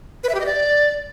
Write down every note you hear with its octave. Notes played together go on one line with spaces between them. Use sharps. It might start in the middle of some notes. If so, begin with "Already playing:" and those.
B4
E5
G4
D#5
D5